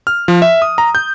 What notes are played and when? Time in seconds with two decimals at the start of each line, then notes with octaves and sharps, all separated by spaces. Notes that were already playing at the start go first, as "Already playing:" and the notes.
0.07 F6
0.28 F3
0.42 E5
0.62 D#6
0.78 A#5
0.95 G6